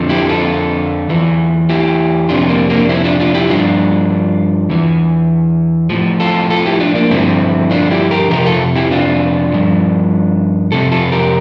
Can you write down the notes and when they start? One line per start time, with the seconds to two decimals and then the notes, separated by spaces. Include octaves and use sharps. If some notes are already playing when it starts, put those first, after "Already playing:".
Already playing: F2 D3 F3
0.09 E4 G4
0.29 F4 A4
1.09 E2 E3
1.69 E4 G4
2.29 F2 C3 F3 D4 F4
2.49 A#3 D4
2.70 A#3 D4
2.89 C4 E4
3.04 D4 F4
3.20 D4 F4
3.34 E4 G4
3.49 G2 F3 D4 F4
4.70 E2 E3
5.90 A2 F3
6.20 F4 A4
6.50 F4 A4
6.66 E4 G4
6.80 D4 F4
6.95 A#3 D4
7.11 G2 D3 F3 C4 E4
7.71 D4 F4
7.91 E4 G4
8.11 G4 A#4
8.30 F2 C3 F3 G4 A#4
8.46 F4 A4
8.76 E4 G4
8.91 D4 F4
9.52 G2 F3
10.72 F2 C3 A4
10.91 F4 A4
11.12 G4 A#4